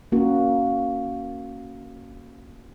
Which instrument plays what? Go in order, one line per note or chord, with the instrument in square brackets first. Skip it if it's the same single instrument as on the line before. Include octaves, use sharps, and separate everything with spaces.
[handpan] A#3 C#4 F#4